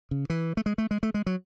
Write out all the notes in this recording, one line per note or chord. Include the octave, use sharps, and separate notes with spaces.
C#3
E3
A3
G#3
A3
G#3
A3
G#3
F#3